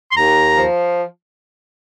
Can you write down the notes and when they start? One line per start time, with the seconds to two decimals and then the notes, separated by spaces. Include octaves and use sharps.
0.11 C6
0.16 D#2 A#5
0.56 F3